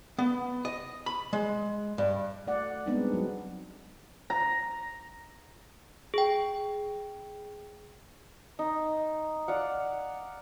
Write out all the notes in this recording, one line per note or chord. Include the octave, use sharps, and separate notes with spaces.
B3
D#5
B5
G#3
G2
A3 D5 F#5
G3 G#3 B3 C4 D4 D#4
F#3
A#5
G#4 G5
D#4
D5 F5 F#5